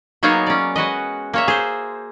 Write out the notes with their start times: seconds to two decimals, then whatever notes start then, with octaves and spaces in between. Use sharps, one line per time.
0.23 F#3 A#3 B3 D#4 G#4 C#5
0.46 C#4 D5
0.76 G#3 F#4 B4 D#5
1.33 A#3 C#5 E5
1.48 G#4 C5